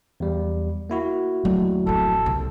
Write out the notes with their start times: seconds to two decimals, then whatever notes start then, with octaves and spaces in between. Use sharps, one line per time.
0.20 E2 G3
0.90 A#3 E4 F#4
1.45 D#2 F#3 A3
1.87 D1 F2 A4
2.26 C2